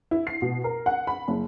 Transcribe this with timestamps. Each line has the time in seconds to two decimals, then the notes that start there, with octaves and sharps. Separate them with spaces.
0.11 E4
0.27 C7
0.42 B2
0.64 A#4
0.86 F#5
1.07 B5
1.28 F#1